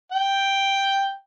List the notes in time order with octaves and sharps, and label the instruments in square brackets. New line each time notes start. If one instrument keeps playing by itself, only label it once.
[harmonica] G5